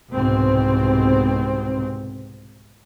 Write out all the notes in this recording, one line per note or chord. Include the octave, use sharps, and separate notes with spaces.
C2 G#2 B2 C4